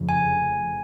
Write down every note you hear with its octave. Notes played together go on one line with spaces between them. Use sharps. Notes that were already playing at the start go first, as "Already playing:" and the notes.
Already playing: F1 F2 C#3
G#5